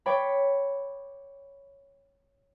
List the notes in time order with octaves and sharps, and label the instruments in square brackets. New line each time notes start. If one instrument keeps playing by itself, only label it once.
[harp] C#5 D5 G5 B5